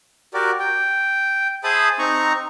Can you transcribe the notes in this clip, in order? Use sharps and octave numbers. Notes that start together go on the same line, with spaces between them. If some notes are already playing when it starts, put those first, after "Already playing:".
F#4 G4 A#4 D5
G5
G#4 C5 E5 A5 B5 D#6
C4 D#4 A#5 C#6